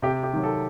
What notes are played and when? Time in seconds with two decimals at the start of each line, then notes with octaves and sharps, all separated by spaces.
0.02 C3 G4
0.23 G4
0.33 D#3 F#3
0.44 A4